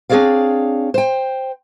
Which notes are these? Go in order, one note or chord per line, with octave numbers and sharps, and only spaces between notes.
C4 D4 G#4 C#5 D5 F5
C5 G5